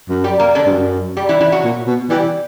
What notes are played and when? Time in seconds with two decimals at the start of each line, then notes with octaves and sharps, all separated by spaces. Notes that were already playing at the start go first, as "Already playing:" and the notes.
0.09 F#2
0.24 G3 G4
0.40 A#3 A#4
0.55 D3 D4
0.66 G2
0.71 F#2
1.17 G3 G4
1.29 E3 E4
1.40 E3 E4
1.52 F#3 F#4
1.64 A#2
1.87 B2
2.10 E3 G3 G4